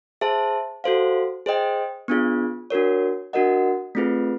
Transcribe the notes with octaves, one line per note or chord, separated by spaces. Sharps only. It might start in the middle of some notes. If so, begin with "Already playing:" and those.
G#4 C5 E5 A5
F#4 A4 C5 F5
G#4 C5 D#5 G5
B3 D4 F4 G#4
D4 F#4 A#4 C#5
D4 F#4 A#4 D#5 F#5
A3 C4 F4 G#4 B4